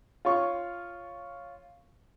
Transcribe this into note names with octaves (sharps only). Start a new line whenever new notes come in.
F4 C#5 C#6